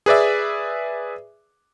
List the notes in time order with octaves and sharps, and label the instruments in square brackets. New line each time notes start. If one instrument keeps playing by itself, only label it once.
[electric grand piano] G#4 B4 D5 E5